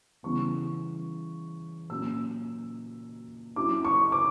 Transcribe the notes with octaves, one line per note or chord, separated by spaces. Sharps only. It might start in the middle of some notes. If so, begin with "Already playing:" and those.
C#3 E3 G3 B3 C#6
A#2 F#3 A#3 C#4 E6
F#3 C#4 E4 D6
C#6
D6